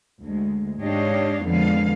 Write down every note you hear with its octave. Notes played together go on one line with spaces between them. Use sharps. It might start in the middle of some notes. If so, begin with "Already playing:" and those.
D2 G#3
G#2 D4 G4 C#5 D#5 F5
F2 D3 F3 G#3 B3 F5